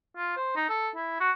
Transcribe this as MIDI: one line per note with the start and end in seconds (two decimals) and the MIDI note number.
0.17 0.34 65
0.36 0.55 72
0.56 0.66 63
0.70 0.89 69
0.96 1.19 64
1.20 1.31 66